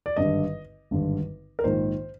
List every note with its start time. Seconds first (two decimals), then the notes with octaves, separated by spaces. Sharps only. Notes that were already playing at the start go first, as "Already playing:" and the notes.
0.06 D5
0.16 G#1 G2 D3 D#5
0.91 G#1 G2 D3
1.59 A#4
1.64 A#1 G#2 D#3 C5